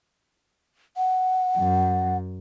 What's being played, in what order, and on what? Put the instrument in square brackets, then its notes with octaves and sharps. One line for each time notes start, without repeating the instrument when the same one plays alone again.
[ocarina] F#5
[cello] F#2